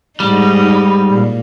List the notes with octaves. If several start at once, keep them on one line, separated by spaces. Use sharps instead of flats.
G#2 G3 D#4
A#2